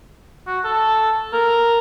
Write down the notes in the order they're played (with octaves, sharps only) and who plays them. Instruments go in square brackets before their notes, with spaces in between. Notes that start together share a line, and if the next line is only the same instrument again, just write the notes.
[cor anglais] F#4
A4
A#4